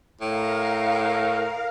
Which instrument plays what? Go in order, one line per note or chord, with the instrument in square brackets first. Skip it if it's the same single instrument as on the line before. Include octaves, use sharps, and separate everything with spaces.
[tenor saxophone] A2 [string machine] A#4 F5